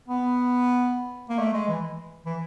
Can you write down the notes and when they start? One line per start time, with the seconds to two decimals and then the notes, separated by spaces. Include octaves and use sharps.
0.08 B3
1.29 A#3
1.39 A3
1.53 G#3
1.68 E3
2.26 E3